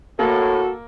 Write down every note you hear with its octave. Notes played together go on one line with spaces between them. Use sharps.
A2 A#3 F#4 A4